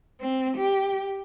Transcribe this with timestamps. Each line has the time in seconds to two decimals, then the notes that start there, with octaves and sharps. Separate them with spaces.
0.20 C4
0.57 G4